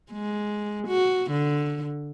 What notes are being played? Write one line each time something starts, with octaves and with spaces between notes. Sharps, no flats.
G#3
F#4
D3